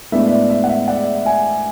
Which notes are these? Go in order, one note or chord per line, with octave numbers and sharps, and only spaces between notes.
A2 G#3 B3 D4 E5
E5
D5
E5
F#5
E5
D5 F#5
E5 G#5